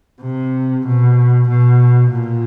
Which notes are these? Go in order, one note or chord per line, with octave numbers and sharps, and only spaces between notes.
C3
B2
B2
A#2